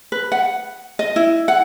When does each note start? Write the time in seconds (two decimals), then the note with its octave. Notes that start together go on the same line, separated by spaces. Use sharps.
0.12 B4
0.32 F#5
0.99 D#5
1.16 E4
1.48 F#5